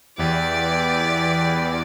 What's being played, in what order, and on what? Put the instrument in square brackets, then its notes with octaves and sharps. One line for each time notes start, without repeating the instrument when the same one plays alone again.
[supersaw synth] E2 [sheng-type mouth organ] E4 G4 B4 [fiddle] D5